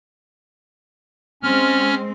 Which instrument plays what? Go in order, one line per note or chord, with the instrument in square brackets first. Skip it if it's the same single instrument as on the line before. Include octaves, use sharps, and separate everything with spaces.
[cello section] G#3 C4 [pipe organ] C#4 F6